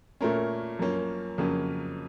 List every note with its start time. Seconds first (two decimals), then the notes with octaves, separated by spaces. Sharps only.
0.21 A#2 A3 C#4 A#4
0.79 F#2 F3 A#3 C#4
1.38 F2 C#3 F#3 A#3 C#4